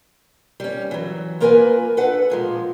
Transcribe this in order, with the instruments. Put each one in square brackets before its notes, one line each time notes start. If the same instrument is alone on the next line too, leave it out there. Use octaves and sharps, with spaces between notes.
[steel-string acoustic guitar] G3 C#4
E3 F#3
A#3 F4 A#4 B4 G5 G#5
D4 A4 B4 F#5
A#2 F3 G#3